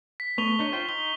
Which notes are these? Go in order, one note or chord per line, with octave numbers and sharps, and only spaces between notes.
B6
A3 B3 C#6 F7 G7
D4 D#4 C#5
F4 C5 G5
D#4 G7